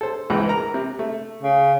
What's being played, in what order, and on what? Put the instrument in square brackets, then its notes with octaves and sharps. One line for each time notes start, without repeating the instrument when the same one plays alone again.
[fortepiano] A4 C5
C#2 G#2 E3
A#4 A#5
C3
A3
[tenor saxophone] C#3